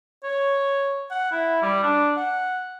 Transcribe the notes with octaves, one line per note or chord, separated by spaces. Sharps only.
C#5
F#5
E4
G3
D4
F#5